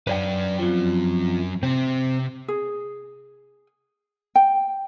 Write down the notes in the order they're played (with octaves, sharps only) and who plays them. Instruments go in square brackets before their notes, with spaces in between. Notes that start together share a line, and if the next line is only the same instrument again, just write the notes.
[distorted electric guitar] F#3 C#4 [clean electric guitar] B4 D5 G5
[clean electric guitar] F2 F3
[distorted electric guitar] C3 [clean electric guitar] C4
[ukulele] G#4
G5